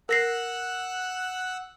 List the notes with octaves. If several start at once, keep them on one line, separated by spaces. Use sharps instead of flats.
A#4 F#5 E6 F#6 A#6 C7